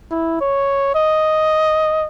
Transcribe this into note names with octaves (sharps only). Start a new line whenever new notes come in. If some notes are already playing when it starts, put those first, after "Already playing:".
E4
C#5
D#5